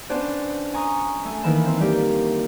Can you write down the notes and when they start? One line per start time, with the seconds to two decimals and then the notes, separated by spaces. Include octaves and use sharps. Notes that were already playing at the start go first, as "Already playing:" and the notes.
0.09 B3 C#4 D4 C5 D5
0.74 G#5 A#5 C#6 D#6
1.25 A3 G#5
1.43 D#3 E3 A#3 B5 E7
1.66 C4
1.80 G3 A#3 G4